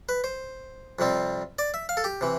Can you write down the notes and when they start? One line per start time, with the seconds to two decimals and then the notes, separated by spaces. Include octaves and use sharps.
0.09 B4
0.24 C5
0.99 F2 C3 G3 C4
1.59 D5
1.74 E5
1.89 F5
1.97 A4
2.04 G4
2.21 C3 E3